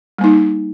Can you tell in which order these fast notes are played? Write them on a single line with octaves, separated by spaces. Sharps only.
G3 A#3 D#4